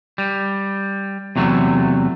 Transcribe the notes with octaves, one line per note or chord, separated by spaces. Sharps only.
G3
E2 C3 F#3 A3